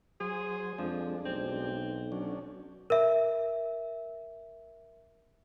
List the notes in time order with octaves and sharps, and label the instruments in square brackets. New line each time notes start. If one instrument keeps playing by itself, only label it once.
[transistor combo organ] F#3 C5 [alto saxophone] G#4
[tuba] F2 [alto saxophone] F3 [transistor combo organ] G#3 D4
[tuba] B1 [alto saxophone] C4
[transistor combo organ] F#3 C#4 D4
[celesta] A#4 E5